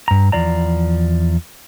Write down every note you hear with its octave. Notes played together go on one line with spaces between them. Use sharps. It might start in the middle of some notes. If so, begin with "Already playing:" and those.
G2 A#5
E2 F3 D5 A#5